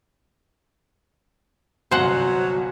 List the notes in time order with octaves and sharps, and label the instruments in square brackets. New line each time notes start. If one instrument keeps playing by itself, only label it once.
[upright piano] G1 C2 G#5 [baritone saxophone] F#3 [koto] C5 F#5